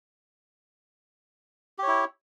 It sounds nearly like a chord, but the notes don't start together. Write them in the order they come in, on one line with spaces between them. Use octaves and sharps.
G4 C#5 E4